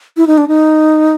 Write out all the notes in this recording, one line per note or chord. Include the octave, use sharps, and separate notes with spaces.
E4
D#4
D4
D#4